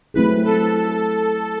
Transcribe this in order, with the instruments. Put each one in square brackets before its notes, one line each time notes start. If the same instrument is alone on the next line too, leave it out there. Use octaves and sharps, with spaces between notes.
[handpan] F#3 A3 C4 E4 G#4 [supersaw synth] B4
[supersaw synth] A4